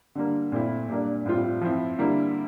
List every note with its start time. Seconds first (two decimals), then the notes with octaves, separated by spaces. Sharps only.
0.15 D3 G3 A#3
0.52 A#2 A3 C4 E4
0.89 A#2 G3 A#3 D4
1.26 A2 G3 C4 F4
1.61 F3 C4 E4
1.98 D3 G3 A#3 E4